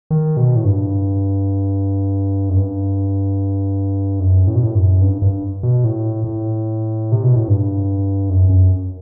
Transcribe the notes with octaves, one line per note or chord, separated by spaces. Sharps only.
D#3
B2
A2
G2
F#2
G2
F#2
A2
B2
A2
F#2
G2
G2
B2
A2
A2
C3
B2
A2
G2
F#2
F#2